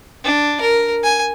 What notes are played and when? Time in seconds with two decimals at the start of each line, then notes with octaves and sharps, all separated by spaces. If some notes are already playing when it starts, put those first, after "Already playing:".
0.24 D4
0.61 A#4
1.04 G#5